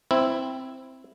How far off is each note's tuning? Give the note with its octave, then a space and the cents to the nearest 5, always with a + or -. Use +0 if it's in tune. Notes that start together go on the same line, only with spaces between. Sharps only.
C4 +0 E4 +0